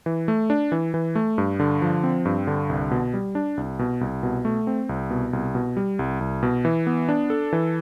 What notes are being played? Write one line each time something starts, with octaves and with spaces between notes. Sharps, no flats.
E3
A3
D4
E3
E3
A3
G2
D3
F3
C4
G2
D3
C2
B2
G3
D4
C2
B2
C2
B2
A3
C4
C2
B2
C2
B2
G3
C2
C2
B2
E3
B3
D4
A4
E3